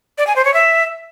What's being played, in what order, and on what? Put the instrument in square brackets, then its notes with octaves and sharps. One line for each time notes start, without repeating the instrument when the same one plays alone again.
[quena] D5
G#5
C5
C#5
E5